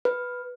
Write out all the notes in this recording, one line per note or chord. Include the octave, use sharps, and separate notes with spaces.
B4